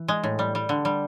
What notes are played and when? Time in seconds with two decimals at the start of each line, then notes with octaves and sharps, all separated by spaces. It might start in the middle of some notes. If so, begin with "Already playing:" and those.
Already playing: E3
0.08 G#3
0.24 A2
0.39 G3
0.55 G3
0.69 D3
0.85 G3